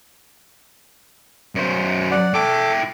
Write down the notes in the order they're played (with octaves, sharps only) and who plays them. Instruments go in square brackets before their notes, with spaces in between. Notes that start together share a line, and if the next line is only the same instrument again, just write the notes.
[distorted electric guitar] F#2 C5
[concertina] D5 F#5
[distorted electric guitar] E4 G5 [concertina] A4 D6